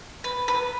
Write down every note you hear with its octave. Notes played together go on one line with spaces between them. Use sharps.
B4
B4